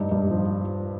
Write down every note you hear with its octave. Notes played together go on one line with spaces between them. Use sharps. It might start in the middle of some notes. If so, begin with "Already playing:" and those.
Already playing: G2 D#4
G2
F3